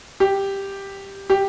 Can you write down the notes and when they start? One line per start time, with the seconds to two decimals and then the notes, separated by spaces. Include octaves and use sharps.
0.20 G4
1.30 G4